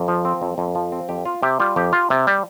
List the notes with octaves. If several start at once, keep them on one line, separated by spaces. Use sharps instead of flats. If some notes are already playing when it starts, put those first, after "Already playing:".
Already playing: F2
F3
C4
F2
F2
F3
C4
F2 G4
F4
C3 G4
G3 F4
F2 G4
F4
C3
G3